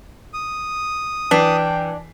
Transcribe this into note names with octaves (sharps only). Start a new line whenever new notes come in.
D#6
E3 D4 G5 B6 C7